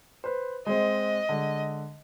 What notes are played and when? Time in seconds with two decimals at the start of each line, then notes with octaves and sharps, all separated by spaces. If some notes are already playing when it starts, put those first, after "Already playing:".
0.24 B4 C5
0.66 G#3 C4 D#5
1.29 D3 G#3